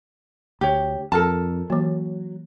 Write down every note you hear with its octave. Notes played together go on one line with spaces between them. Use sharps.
D2 G4 C#5
F2 A4 A#4 A5
E3 F#3 A#3